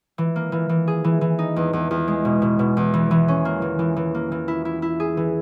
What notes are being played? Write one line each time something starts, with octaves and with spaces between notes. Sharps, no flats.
E3
A#3
E3
E3
G#4
E3
E3
D#4
E2
E2
E2
G#3
B2
B2
B2
E2
E3
E3
C#4
A#3
E3
E3
E3
A#3
E3
E4
E4
E4
G#4
E3